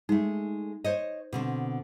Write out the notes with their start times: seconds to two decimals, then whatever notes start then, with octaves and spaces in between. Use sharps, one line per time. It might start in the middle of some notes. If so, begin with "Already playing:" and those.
0.09 G#3 A3 D#4
0.84 C5 C#5 D#5
1.33 B2 D3 C4